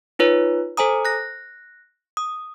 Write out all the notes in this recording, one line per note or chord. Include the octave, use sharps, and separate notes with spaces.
D#4 F4 B4 C#5
A4 C5 G#5 A#5 D#6
F#6 A#6
D#6